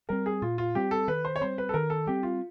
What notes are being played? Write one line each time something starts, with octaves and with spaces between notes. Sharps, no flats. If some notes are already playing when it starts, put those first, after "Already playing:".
G3 C4 A#4
G#4
A#2 F4
F4
G3 C4 G4
A4
D#3 B4
C5
C#5
G3 C4 C5
B4
A4
D#3 A#4
A4
G3 C4 G4
F4